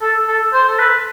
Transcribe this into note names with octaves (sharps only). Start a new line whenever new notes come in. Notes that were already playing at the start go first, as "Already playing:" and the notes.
A4
A4
C5
A4
B4